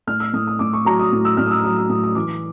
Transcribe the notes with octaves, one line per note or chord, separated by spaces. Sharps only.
A2 F6
E6
A2 D#6
D#6
A2 D6
C#6
F#3 A#5
D#6
A2
E6
A2 F6
D#6
E6
F#3 D#6
E6
A2 D#6
D#6
E3 D6